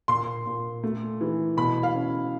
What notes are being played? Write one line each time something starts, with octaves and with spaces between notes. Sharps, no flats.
A#2 C6
A#2
A3
E3
B2 B5
F5
C#4